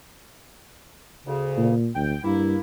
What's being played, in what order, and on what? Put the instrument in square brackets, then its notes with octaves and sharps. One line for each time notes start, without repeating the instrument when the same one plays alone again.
[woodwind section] D2 C#3
[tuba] A#2
[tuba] D2 [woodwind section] G5
[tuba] G2 [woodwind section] A#3 E4